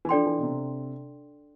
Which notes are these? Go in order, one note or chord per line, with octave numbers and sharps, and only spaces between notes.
E3
F3 D4 A4 D5 G5 C6
E3
B2
C3